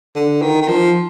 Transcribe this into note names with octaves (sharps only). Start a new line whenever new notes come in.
D3
D#3
D#3
F3